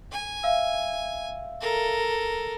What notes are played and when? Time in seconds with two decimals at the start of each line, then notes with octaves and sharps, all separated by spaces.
0.12 G#5
0.43 E5 F5 E6
1.61 A4 A#4